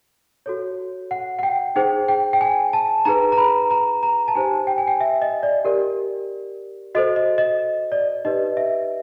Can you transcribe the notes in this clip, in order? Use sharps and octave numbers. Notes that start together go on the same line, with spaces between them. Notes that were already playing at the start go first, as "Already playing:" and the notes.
F#4 A4 C#5
F#5
F#5
G5
D#4 G#4 C5 G5
G5
G5
G#5
A5
D#4 G#4 B4 A#5
A#5
B5
A#5
A#5
A5
D#4 G4 C5 G#5
G5
G#5
G5
E5
D#5
D5
G4 A#4 D5
F#4 A4 C5 D#5
D#5
D#5
D5
D#4 G4 B4 D5 D#5
E5